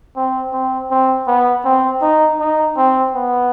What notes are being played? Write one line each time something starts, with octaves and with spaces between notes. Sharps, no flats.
C4
C4
C4
B3
C4
D#4
D#4
C4
B3